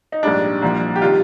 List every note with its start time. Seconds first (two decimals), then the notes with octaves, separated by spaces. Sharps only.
0.12 D#4
0.23 A#1 G#2 G3 D4
0.62 C2 A#2 F3
0.96 G4
1.02 C3 D#3 G3 F4